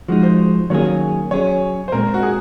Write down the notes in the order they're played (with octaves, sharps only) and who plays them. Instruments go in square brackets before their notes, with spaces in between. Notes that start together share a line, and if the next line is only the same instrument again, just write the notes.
[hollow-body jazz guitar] F3 G#3 D#4 [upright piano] F#4
[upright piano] C5
[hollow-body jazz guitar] D#3 F#3 A#3 C#4 G#4 [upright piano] C#5
[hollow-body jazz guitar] F#3 C#4 G#4 [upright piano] C#5
[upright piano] C5
[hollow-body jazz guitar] A#2 G#3 C4 [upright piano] A#4
[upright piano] F#4
G#4